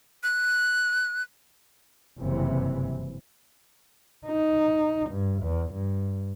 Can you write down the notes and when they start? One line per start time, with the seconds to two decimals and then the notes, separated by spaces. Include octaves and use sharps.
0.23 F#6
2.19 F#1 G2 C3 E3
4.27 D#4
5.10 G2
5.43 E2
5.74 G2